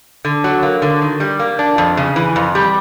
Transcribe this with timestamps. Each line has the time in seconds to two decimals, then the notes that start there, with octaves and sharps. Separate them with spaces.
0.25 D3
0.44 F#3
0.63 A#3
0.82 D3
1.02 D#3
1.20 G3
1.39 A#3
1.59 D4
1.78 F2
1.97 C#3
2.16 E3
2.36 F2
2.55 G3